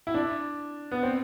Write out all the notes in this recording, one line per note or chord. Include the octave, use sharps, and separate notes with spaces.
E4
D4
B3
C4